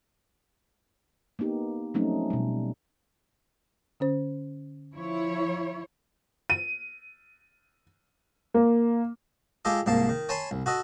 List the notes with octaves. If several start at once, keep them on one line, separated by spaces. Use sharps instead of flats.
A#3 B3 D#4 G4
F3 F#3 A3 C4 C#4 D#4
B2 G3
D3 C#4 C5
F3 E4 C#5
D#7
A#3
G#3 F4 G4 A4 D#5
C2 G#2 A#3 A5
D#3
C#5 G#5 A5 B5 C6
C2
F#4 A4 D#5